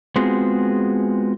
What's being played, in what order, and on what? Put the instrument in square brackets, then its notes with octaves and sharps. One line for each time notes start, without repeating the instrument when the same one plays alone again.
[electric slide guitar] G#3 B3 C4 F4 F#4 G#4